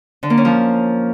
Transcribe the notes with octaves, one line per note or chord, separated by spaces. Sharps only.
D3
A#3
C#4
F3